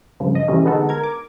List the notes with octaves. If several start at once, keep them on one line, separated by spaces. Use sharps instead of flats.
G2 C#3 F3
D#5
C3 E3 G3 A3 C#4
D3 G#3 B3 D#4 F#4 A4
A#4 G#6
D6